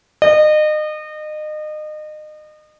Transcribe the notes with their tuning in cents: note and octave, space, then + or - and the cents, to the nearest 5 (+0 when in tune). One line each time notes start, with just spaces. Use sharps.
D#5 -30